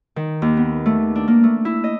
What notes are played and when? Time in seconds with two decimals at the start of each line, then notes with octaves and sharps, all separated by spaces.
0.16 D#3
0.42 D#2
0.57 B3
0.86 A3
1.16 D4
1.28 A#3
1.43 A3
1.65 E4
1.84 D#5